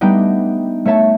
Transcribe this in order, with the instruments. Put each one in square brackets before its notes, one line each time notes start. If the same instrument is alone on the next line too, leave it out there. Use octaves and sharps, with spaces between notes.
[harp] G3 A3 B3 D4 D#4 G5
A3 C#5 E5 A5